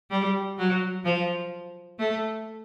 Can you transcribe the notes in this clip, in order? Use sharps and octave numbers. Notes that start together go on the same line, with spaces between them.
G3
F#3
F3
A3